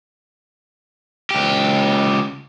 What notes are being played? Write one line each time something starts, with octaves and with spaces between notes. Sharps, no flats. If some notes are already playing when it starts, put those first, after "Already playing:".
C#2 G4